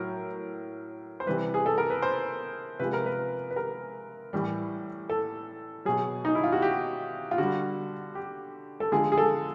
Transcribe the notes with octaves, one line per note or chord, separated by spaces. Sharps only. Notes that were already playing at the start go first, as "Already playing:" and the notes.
Already playing: A2 F#3 A#4
C5
C3 E3 G3 B4
G#4
A4
A#4
B4
C5
C3 F3 G#3 B4
A#4
B4
B4
A#4
A2 E3 G3
A4
B2 F#3 G#4
D#4
E4
F4
F#4
G4
F4
D3 G3 F#4
G4
A4
D3 F3 G#3 G#4
G#4
A4